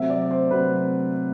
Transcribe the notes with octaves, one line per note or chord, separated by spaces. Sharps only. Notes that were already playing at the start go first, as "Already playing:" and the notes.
Already playing: C3 F#3 A3 C4 E5
D5
C5
C3 F#3 A3 C4 B4